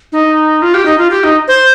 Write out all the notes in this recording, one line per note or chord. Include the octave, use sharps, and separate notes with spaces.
D#4
F4
G4
D#4
F4
G4
D#4
C5